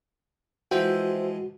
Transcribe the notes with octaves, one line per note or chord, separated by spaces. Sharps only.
E3 F3 G#3 F#4 C5 E5 G5